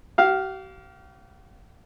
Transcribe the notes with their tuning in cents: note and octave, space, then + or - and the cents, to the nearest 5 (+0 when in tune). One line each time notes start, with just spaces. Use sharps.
G4 -45 F5 +0